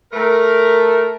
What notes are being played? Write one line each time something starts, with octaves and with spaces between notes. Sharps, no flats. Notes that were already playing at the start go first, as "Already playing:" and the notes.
A3 A#4